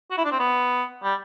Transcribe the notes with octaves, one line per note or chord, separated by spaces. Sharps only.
F#4
E4
D4
C4
B3
G3